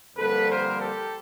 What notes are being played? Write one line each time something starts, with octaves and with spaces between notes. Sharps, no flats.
F2 D3 G3 A#3 A4 B4
A#4 C5
G4 A4